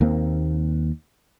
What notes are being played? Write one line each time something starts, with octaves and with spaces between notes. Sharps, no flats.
D#2 A#3 C4